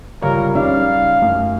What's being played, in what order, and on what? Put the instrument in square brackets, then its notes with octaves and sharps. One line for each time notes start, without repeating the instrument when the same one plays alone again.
[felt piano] C#2 G3 C#5 [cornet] A#4 [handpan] F5
[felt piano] G3 [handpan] C#4 D#4 D5 [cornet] F5
[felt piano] F#2 [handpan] A3